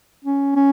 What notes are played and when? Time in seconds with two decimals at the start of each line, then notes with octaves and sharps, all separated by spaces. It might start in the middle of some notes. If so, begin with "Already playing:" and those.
0.24 C#4
0.56 C#4